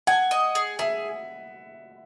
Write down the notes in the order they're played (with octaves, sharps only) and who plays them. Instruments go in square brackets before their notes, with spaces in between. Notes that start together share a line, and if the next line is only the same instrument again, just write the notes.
[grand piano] F#5 [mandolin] G#5
[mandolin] D#5
G#4
[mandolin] G#4 [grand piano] E5